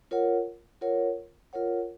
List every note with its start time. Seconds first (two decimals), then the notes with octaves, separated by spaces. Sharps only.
0.11 F4 A#4 C#5 F#5
0.81 F4 A#4 C#5 F#5
1.53 F4 A#4 C#5 F#5